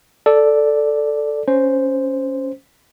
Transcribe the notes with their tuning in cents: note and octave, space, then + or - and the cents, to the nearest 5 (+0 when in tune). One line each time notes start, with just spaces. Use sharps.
A4 +0 D5 +0
C#4 +0 C5 -5